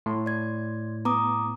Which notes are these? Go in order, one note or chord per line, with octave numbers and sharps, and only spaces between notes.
A2 C6
D5 G#6
B3 A#5 D6 D#6